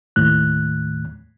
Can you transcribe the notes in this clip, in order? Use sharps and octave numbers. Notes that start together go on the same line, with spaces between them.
D#2 A2 F#6